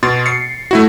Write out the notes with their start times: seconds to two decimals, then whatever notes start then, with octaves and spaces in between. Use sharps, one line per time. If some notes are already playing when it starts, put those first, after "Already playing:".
0.03 B2 C6 A6
0.26 C7 C#7
0.71 A3 E4 F#4